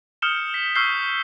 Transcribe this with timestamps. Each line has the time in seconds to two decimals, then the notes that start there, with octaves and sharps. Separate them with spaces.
0.22 D#6 F6 G6 C#7 E7 G7
0.54 B6
0.75 C#6 E6 F6 G6 C7 G7